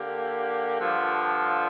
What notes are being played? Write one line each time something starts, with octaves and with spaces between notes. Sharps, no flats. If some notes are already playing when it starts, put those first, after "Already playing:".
Already playing: D3 A#3 G4
G2 D3 F3